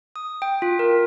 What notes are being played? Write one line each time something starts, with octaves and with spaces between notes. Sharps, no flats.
D#6
G5
F4
A#4